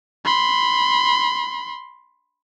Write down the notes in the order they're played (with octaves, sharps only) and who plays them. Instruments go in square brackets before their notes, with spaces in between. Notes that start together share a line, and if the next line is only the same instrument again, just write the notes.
[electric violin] B5 C6